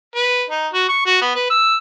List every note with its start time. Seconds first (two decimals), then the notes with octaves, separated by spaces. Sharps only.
0.16 B4
0.50 D#4
0.73 F#4
0.89 C#6
1.06 F#4
1.21 B3
1.35 B4
1.50 E6